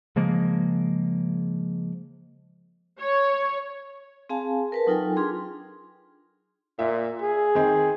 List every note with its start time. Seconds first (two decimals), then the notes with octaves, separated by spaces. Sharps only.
0.16 C#3 F3 G#3 A#3
2.99 C#5
4.29 C4 G#4 F5 G#5 A5
4.72 A#4 B4 A5
4.87 F#3 D#4 F4 A4 G5 G#5
5.17 D4 F4 G#4 C6
6.79 A#2 E5
7.22 G#4
7.55 D#3 C4